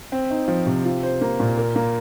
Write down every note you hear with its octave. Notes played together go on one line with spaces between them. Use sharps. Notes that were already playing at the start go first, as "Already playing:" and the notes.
C4
D#4
F3
C3
F4
C5
A#3
A#2
A#4
A#3